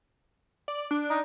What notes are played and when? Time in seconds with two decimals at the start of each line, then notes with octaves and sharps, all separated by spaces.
0.68 D5
0.91 D4
1.10 D#4